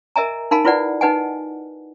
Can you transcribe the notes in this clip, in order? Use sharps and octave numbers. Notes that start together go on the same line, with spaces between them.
A#4 D#5 E5 G#5 A#5
D#4 A#4 F5 G#5 B5
E4 F4 B4 D5 F#5
D#4 B4 D#5 F#5 G#5